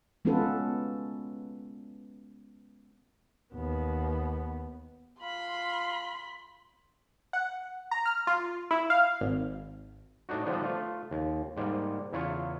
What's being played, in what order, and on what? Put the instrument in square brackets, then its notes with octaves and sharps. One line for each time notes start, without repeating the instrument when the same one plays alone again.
[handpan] G#3 B3 C#4 F4 A4 B4
[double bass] D#2 B3
[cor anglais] F4 [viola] B5 [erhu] C6
[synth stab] F#5
A#5
F6
F4
E4
F5
G#1
[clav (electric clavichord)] A2 D4 D#4 F#4
D3 F3 G3 B3 D4 D#4
A3 F4
D#2
G#2 G3 A#3
E2 C#3 E4 F4 C#5